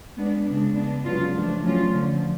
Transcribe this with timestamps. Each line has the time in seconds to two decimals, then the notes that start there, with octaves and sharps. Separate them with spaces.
0.17 G#3 B3 D4
0.46 C#3 G#3 D4
0.75 G#3 B3 D4
1.04 C#3 F#3 B3 F4
1.34 F3 A3 D4
1.63 F#3 A3 C#4 F4
1.93 D3 F3 A3